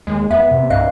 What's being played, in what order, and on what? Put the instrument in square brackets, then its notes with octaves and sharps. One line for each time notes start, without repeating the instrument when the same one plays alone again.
[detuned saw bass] D#2 [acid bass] G#3
[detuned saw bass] E2 [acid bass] B3 [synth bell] E5
[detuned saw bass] C3
[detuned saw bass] C2 [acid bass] G2 [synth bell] D#5 F5 F#6